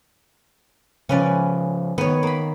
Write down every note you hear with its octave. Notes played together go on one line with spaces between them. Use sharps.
C#3 F3 C#4 B4 D5
D#3 B3 C#5
A#3 B5